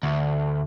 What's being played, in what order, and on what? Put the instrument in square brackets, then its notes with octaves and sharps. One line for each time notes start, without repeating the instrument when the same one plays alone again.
[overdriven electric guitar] D2